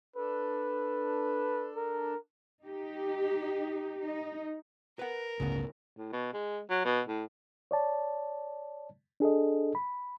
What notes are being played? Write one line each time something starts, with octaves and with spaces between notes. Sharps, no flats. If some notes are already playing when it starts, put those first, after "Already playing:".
D4 A4 B4
A#4
D#4 G4
D#4
A#4 B4 F#5
G1 C#2 A2 C#3 B3
A2
B2
G#3
F#3
B2
A2
C#5 D5 A5
D4 G#4 A4 D#5
B5